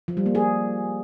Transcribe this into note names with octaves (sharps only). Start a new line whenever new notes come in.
F3
G3
A#3
G#4